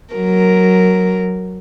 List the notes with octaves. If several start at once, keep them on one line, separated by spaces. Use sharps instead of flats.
F#3 A#4